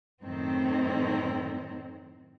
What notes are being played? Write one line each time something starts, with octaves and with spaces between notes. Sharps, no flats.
F#2 A2 D#3 C4